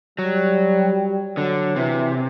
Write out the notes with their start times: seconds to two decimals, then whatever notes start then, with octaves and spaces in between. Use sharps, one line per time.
0.19 F#3 G3
1.36 D3 F#3
1.76 C3 E3